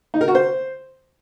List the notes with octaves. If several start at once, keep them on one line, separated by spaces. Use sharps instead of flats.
D#4
A#4
F#4
C5